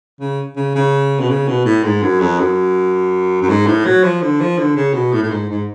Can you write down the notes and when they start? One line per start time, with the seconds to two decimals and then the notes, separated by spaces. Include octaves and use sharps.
0.20 C#3
0.56 C#3
0.75 C#3
1.20 B2
1.29 C#3
1.48 B2
1.65 A2
1.84 G#2
2.03 F#2
2.20 F2
2.39 F#2
3.41 F#2
3.49 G#2
3.66 A2
3.85 F#3
4.03 F3
4.22 D3
4.40 F3
4.58 D3
4.76 C#3
4.94 B2
5.12 A2
5.23 A2
5.31 G#2
5.50 G#2